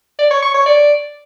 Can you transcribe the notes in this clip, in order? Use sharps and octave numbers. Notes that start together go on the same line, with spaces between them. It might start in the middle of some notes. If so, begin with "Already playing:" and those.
D5
C#5
C#6
C#5
D5